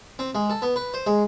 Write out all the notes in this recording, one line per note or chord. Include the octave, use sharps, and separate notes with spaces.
C4
G#3
A4
B3
B4
C5
G#3